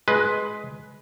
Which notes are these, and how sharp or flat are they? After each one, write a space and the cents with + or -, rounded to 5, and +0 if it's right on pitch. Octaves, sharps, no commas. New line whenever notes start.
G#3 +15 B4 +0